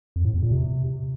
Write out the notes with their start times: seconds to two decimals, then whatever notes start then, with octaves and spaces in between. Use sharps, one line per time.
0.16 F2
0.25 A2
0.34 E2
0.43 A#2
0.51 C3